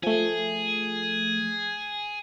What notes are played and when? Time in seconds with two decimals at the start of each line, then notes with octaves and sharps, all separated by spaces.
0.03 F3 A3 G#4